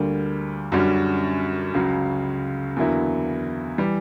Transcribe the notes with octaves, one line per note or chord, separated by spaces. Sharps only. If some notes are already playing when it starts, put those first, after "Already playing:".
Already playing: D2 D3 G3 A#3
F#2 D3 G3 C#4 F#4
C#2 C#3 F#3
E2 D3 F#3 A#3 E4
E3 G3